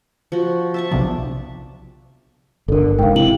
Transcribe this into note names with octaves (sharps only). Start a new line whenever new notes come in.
F3 F#4
E5 A5 C#6
B1 C3 F3 D4
G1 D3 A4 A#4
F1 G#2 F5 G5
C3 E4 F#7